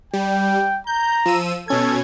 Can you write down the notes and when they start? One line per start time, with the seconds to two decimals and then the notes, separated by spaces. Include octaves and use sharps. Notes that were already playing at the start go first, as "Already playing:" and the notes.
0.13 G3 G5
0.87 A#5 G6
1.26 F3 E6 D#7
1.68 B2 C#4 A4 G#6